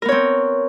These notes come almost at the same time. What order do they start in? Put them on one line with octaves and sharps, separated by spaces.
A#4 B3 C#5 C4